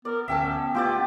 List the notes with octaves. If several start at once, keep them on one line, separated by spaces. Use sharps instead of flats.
B3 A#4 D5
D2 C#4 E5 G5 A5
A3 B3 F4 G4 D5 G5